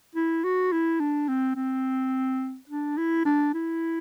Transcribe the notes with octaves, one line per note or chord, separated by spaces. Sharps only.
E4
F#4
E4
D4
C4
C4
D4
E4
D4
E4